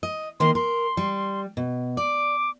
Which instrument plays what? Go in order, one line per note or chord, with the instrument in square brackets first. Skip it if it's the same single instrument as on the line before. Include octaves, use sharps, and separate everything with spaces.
[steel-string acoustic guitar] D#5
[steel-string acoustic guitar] D#3 A#3 [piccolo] C6
[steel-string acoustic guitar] A#4 [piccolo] C6
[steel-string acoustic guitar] G3
B2
[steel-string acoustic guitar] D5 [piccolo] D6